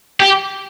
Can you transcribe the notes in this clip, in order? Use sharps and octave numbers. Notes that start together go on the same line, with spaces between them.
G4